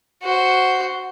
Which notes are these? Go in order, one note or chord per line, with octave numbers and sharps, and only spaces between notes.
F#4 C5